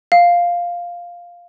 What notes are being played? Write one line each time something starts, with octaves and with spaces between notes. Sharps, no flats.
F5